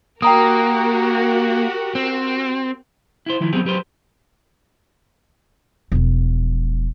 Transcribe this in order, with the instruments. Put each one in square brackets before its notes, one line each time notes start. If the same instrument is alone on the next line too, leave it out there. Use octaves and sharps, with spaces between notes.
[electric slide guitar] A#3 [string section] F#4 G4 A#4 [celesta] G5 A#5 D#6
[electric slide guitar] C4
[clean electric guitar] E4 C5
D#3 F3 E4
F#3 B3 C4 G4 G#4
F#3 G4 B4 C5
[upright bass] E1 F3